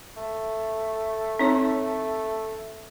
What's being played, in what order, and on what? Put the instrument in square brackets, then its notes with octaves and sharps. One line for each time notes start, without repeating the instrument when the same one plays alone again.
[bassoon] A3
[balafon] C4 D#4 C#5